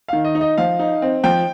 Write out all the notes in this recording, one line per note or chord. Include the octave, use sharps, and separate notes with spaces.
D#3 F5
D#5
D#4
D#5
F3 F5
D#4
C4
F3 G5